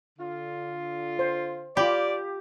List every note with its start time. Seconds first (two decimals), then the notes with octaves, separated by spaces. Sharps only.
0.19 D3 F4
1.19 C5
1.77 F4 G4 D5 B5